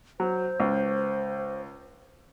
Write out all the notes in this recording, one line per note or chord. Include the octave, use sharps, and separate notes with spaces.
F#3 C5
C#2